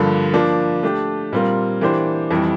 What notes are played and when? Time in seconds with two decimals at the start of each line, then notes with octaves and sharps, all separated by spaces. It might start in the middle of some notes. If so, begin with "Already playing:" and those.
Already playing: G2 D3 F3 A#3
0.34 F3 A#3 D4
0.83 A3 D4 G4
1.32 A#2 G3 C4 F4 A#4
1.81 E3 A#3 D4 G4 C5
2.31 F2 E3 G3